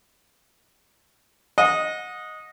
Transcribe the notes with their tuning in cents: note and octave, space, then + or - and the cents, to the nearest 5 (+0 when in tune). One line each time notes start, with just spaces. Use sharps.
D#5 +0 F#5 -30